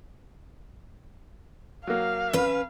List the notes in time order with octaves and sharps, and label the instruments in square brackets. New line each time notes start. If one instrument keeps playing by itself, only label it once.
[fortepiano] F#3 A#3 [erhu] F5
[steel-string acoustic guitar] C#4 B4